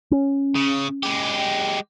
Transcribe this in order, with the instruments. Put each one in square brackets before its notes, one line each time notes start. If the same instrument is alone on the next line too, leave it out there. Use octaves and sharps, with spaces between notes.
[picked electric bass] C#4
[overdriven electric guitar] C#3
G#3 G4